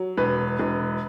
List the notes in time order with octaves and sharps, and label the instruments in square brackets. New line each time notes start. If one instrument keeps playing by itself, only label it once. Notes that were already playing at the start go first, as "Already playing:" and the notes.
Already playing: [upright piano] F#3
E1 B4
E1